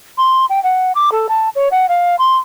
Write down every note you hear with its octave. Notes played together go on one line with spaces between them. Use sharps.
C6
G5
F#5
D6
A4
A5
C#5
F#5
F5
C6